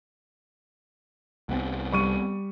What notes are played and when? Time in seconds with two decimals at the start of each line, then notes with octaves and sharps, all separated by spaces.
1.49 C2 B3 C4
1.92 G3 C#6 D#7